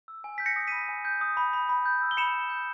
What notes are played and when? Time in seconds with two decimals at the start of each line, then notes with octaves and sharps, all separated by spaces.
0.08 E6
0.24 G#5
0.38 G6 B6
0.46 A#6 C#7
0.56 D#6
0.67 B5 B6 D#7
0.89 G#5
1.05 G6
1.21 D#6
1.37 B5
1.53 B5
1.69 B5
1.85 G6
2.02 E6
2.11 G7
2.17 B5 C#7 E7
2.33 B5
2.50 G6